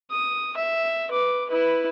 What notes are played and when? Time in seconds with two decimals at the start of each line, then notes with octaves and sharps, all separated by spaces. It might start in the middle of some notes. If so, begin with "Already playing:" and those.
0.11 D#6
0.57 E5
1.11 B4 D6
1.49 E4 B4